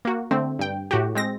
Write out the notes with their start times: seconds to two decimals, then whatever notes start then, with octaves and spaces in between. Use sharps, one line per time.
0.05 A#3 F#4
0.31 D3 A3 C4
0.59 G2 G5
0.91 A2 F#4 G4
1.15 G#3 C4 A#6